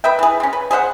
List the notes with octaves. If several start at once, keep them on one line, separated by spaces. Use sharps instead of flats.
B4 D#5 E5 G5
E3 G#4
C4 C#4
B4
G#4 C5 E5 F#5